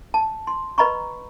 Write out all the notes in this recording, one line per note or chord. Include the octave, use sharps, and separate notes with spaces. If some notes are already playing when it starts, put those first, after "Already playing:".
A5
C6
B4 D#5 A#5 B5 C#6